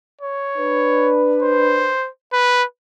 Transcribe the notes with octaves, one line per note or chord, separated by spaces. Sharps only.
C#5
D4 B4
C5
B4